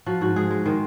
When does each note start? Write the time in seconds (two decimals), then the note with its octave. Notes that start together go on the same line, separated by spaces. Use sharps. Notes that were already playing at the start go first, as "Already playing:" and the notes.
0.06 F3 F#4
0.21 G#2 F#4
0.36 G#3 G#4
0.51 G#3
0.65 D#3 C5